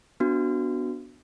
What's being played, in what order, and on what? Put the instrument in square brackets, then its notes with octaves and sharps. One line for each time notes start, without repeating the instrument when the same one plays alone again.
[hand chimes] B3 D4 F#4